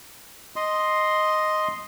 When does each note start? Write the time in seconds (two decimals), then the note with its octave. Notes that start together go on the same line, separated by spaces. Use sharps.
0.56 D#5 C6